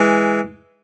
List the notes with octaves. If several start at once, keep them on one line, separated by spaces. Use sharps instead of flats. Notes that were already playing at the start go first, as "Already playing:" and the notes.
Already playing: E3 G#3